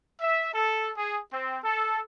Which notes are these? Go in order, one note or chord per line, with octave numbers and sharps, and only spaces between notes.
E5
A4
G#4
C4
A4